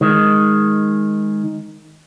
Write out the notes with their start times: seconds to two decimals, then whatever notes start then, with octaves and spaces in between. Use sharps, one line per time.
0.01 D#3 G#3